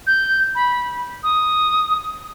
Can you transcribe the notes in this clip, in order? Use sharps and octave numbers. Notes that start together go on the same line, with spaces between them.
G6
B5
D#6